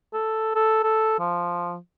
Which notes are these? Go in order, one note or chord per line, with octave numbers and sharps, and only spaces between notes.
A4
A4
A4
F3